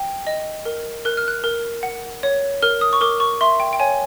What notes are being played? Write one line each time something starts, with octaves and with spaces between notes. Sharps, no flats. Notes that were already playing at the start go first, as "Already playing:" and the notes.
Already playing: G5
D#5
A#4
A#4 F#6
F6
F#6
A#4
F#5
C#5
A#4 F6
D#6
C#6
A#4 D6
C#6
E5 C6
G5
G5
C#5 G#5